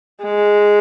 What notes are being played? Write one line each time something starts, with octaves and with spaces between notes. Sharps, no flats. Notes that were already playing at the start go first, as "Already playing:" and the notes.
G#3